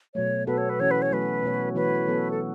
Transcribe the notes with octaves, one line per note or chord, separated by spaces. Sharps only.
B2 F#3 A3 C#5
B2 B3 F#4 A4 B4
C#5
B4
E3 C#4 F#4 C#5
B4
C#5
F#3 A3 F#4 B4
B2 A3 F#4 C#5
E3 A3 F#4 B4 C#5
F#3 B3 A4
A4